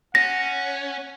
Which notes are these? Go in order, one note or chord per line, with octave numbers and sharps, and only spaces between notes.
C#4 F#5 A#6